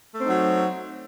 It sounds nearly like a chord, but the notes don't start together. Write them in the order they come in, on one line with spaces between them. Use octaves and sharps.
A3 C4 D#4 F#3